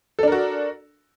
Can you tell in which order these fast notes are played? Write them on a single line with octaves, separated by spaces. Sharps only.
A4 D4 A#4 F#4